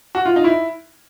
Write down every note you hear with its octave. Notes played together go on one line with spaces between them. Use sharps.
F#4
F4
D#4
E4